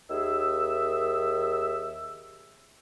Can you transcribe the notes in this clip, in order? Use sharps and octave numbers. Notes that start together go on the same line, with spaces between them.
D#2 D#3 G#4 E5 E6